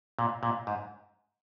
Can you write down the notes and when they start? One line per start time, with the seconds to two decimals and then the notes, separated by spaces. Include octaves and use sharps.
0.19 A#2
0.43 A#2
0.67 G#2